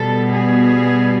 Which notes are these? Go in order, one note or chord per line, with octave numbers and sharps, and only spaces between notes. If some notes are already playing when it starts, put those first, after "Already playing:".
Already playing: B2 G3 B3 A4
G#4